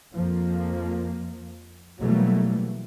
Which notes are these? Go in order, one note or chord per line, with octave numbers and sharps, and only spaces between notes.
F2 F3 A#3
B2 E3 F#3 G3 A3 A#3